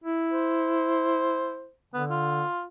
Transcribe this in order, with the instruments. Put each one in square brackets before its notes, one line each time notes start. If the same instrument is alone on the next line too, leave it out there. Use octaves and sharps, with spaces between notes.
[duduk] E4
[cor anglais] C5
[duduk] D3 [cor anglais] B3
[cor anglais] F4